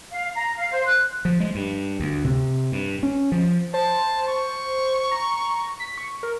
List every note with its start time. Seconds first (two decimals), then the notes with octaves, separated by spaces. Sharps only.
0.11 F5
0.34 A#5
0.57 F5
0.72 C5
0.86 F#6
1.25 F3
1.40 G#3
1.55 G2
2.00 D2
2.24 C3
2.72 G2
3.03 C#4
3.32 F3
3.74 C5 A5
4.28 C#6
5.11 A#5
5.80 B6
5.98 C#6
6.23 A#4